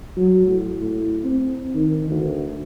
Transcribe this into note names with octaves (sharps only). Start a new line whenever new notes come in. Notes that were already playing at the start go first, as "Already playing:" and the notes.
F#3
A2
A2
C4
D#3
D2